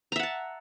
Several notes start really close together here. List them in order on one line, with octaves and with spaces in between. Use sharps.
A#5 E5 F#5 A5